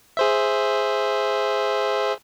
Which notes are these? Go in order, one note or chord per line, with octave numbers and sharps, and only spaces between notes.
G#4 C5 E5